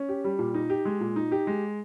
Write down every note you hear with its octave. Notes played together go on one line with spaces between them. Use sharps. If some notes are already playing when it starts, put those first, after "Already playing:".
Already playing: C#4
G4
G3
A#2
D#4
G4
G#3
A#2
D#4
G4
G#3